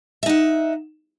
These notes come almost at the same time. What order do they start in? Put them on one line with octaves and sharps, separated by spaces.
E5 D#4 F#5